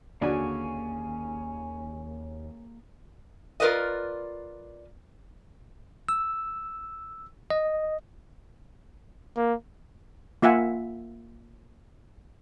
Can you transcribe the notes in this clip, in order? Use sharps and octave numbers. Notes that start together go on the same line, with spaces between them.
D#2 D3 A#3 C#4 F#4 G#4 D5 G#5
F4 A#4 B4 D5 D#5
E6
D#5
A#3
A#3 F4 E5 F#5 G#5